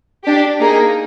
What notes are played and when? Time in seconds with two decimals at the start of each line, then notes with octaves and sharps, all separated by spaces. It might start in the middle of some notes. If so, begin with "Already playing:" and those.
0.24 D4 G4
0.60 A#3 D#4 G#4